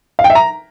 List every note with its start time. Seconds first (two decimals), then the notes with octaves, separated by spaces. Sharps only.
0.19 F5
0.24 G5
0.30 E5
0.35 A#5